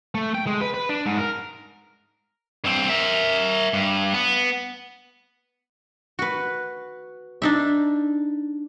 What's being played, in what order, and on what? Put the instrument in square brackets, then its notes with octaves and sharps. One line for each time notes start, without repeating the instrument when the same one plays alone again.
[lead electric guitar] A3
G5
G#3
B4
B4
D4
G#2
A#4
[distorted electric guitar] G2 C4
A#4 E5
G2
B3
[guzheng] F#4 B4
D4 D#4 E5